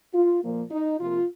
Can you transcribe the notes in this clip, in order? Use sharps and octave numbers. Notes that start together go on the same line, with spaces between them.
F4
A#2 F3 A#3
D#4
C3 F3 A#3 F4